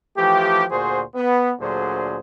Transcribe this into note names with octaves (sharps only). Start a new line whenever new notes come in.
E3 F3 A3 G4
D2 A#2 F#4 G#4 C5
B3
D2 A#2 D3 F#3 G#4 C5